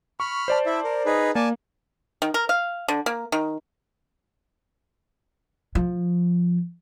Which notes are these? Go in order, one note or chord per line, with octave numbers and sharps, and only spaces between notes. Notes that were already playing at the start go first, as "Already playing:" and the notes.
B5 C#6 F6
C5 D5 A5
E4 E5
A#4
D#4 G#4 B4
A#3 D5 G#5 A5
D#3
A#4
F5
D3
A#3
D#3
F3